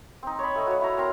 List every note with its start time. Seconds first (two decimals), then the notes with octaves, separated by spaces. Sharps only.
0.23 C4 D#4
0.39 C#5 B5
0.56 A3 A4 D#5
0.67 F#4 C#5
0.81 E4 A#5
0.97 C4 A#4 A#5 C6